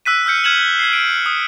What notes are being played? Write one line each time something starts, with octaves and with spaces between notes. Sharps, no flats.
E6 F#6 B6 D#7
E6 F6 G6 C#7
F6 G#6 E7 F#7
G#6 C7
D7
D#6